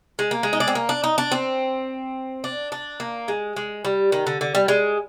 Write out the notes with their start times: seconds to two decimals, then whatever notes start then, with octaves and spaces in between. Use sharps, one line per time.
0.19 G#3
0.31 A#3
0.43 G#3
0.53 D#4
0.60 D4
0.68 C4
0.75 A#3
0.89 D4
1.04 D#4
1.18 D4
1.32 C4
2.44 D4
2.72 D4
3.00 A#3
3.28 G#3
3.56 G#3
3.85 G3
4.12 D#3
4.27 D3
4.41 D3
4.55 G3
4.68 G#3